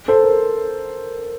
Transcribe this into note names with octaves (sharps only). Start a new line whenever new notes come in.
A4 C5
A#4